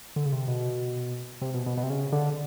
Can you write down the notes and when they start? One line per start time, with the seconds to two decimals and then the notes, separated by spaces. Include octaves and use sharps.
0.16 D3
0.26 C#3
0.32 C3
0.47 B2
1.41 C3
1.54 B2
1.66 B2
1.77 B2
1.83 C3
1.90 C#3
2.12 D3